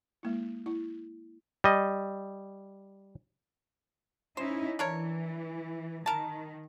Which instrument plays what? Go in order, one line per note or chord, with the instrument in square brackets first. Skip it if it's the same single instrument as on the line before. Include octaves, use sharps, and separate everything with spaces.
[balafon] G#3 A#3 E4
E4
[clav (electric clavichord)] G3 D#5
[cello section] C#4 D#4 E4 [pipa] C5
[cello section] E3 [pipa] D4 A#4 C#5
[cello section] D#3 [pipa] A#4 A5